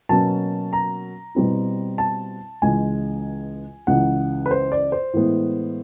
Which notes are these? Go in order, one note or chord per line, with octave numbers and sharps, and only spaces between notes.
B2 F#3 A#3 C#4 A5
A#5
B2 G3 C4 E4
A5
C#2 C#3 E3 G#3 G#5
C#2 C#3 E3 F#5
B4
C5
D5
C5
A2 E3 G#3 B3